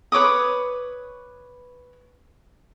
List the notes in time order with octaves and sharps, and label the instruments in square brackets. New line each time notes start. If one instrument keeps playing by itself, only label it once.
[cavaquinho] B4 C#5 D6 D#6